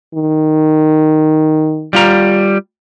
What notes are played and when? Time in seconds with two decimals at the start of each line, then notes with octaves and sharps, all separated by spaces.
0.15 D#3
1.93 G3 F4 A#5